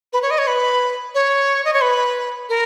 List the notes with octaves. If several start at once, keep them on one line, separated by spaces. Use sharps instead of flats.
B4
C#5
D#5
C#5
B4
C#5
D#5
C#5
B4
A#4